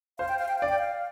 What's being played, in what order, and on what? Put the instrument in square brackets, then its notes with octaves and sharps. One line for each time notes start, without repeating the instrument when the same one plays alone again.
[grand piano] C5 [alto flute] F5
[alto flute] G5
F5
G5
[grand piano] D5 [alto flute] F5
[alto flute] G5
F5